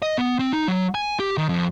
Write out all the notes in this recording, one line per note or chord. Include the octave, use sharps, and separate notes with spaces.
D#5
B3
C4
D#4
F#3
G#5
G4
D#3
F2